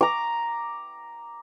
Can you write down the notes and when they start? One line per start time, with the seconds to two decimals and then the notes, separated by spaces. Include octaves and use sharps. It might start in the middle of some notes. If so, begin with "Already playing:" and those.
0.01 A#5 D6